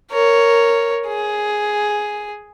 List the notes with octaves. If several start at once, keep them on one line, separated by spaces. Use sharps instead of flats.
A#4 C#5
G#4